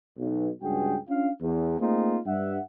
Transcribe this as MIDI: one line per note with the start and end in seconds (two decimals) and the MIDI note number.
0.17 0.47 35
0.61 0.95 37
0.61 0.95 43
0.61 0.95 66
0.61 0.95 68
0.61 0.95 79
1.08 1.29 61
1.08 1.29 62
1.08 1.29 65
1.08 1.29 77
1.41 1.77 40
1.79 2.17 57
1.79 2.17 58
1.79 2.17 60
1.79 2.17 63
1.79 2.17 65
1.79 2.17 68
2.26 2.58 43
2.26 2.58 76
2.26 2.58 78